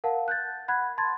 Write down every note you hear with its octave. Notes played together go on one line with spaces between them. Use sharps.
A#4 F5 F#5 A5
F#6 G6 A6
F#5 B5 F#6 G#6
A5 B5 C6 G#6 A6